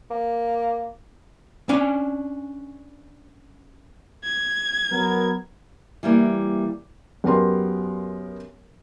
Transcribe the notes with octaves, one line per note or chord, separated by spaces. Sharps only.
A#3
C#4 D4 G#5
G#6
F#3 B3 A#4
E3 G3 A#3
F#2 B3 G4 A#4 C6